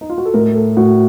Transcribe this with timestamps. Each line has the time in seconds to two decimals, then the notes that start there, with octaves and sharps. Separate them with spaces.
0.01 D#4
0.10 F4
0.18 F#4
0.26 A4
0.34 A2 A#4
0.55 A4
0.77 A2 F#4